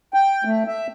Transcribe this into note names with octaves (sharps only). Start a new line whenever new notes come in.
G5
A3
E5